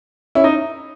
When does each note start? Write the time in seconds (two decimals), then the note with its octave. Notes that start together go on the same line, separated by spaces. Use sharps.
0.35 C#4 E4
0.44 D#4